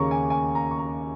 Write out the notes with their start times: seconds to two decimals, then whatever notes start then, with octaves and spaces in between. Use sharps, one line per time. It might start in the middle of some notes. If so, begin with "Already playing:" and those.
Already playing: D#2 C#3 A#3 C#4 A#5 C#6
0.11 G#5
0.30 G#5
0.55 A#5
0.71 C#6
0.79 A#5